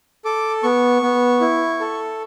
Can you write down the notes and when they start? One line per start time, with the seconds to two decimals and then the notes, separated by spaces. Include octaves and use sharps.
0.25 A4 D6
0.63 B3 C#6
1.02 B3
1.41 E4
1.81 A4